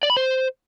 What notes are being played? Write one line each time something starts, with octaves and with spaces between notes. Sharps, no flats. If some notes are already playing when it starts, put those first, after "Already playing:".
D5
B5
C5